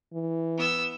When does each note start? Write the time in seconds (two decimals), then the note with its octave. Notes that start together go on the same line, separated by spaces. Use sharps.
0.13 E3
0.58 B3 E6